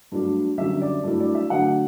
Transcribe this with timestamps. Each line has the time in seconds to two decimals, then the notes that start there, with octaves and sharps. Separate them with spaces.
0.12 G2 F#3 A3 D4
0.58 F#2 D3 G3 E5
0.81 D5
1.04 G2 F#3 A3 E4
1.20 D5
1.35 E5
1.50 D3 F#3 A3 D4 F#5